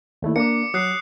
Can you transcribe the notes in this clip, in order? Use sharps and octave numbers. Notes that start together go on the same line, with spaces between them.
D#2 A3 E4
A#3 D4 D6 C#7
F#3 D#6 F#6 C7